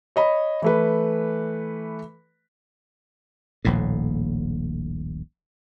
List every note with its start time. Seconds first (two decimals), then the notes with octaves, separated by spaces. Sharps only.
0.16 C#5 D#5 B5
0.62 E3 A3 B4
3.65 D#1 A#1 A2